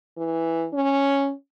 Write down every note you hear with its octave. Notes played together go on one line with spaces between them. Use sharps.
E3
C#4